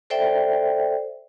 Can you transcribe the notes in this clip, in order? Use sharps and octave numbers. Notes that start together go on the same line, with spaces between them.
A4 C5 D5 E5 G5